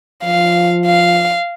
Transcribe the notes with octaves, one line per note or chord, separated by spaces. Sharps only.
F3 F5
F5